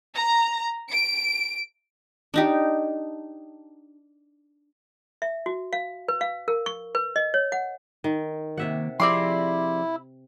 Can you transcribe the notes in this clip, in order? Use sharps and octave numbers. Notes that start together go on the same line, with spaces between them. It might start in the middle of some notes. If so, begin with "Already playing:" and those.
A#5
D7
D4 D#4 G4
E5
F#4
F5
B4
F5
A#4
C#6
B4
D#5
C#5
F#5
D#3
C3 D#3 A#3 E5 F#5
F3 C4 E4 G4 G#4 D5 C6